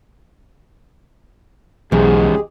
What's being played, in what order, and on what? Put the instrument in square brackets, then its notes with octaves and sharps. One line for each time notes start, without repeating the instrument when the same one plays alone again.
[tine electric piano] B1 [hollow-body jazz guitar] E2 [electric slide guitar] G#2 C#3 [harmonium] G#3 G4 G#4